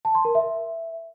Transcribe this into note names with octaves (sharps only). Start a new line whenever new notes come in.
A5
C6
A#4
E5